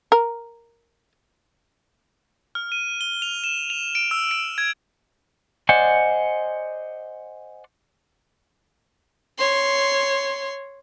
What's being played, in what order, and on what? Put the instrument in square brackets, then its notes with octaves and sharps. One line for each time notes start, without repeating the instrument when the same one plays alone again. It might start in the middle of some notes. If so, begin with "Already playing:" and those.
[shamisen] A#4
[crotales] F6
D#7
G7
F7
E7
F7
D7
E6
D7
G#6
[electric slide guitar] C5 D5 D#5 F#5 G#5
[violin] C#5 C6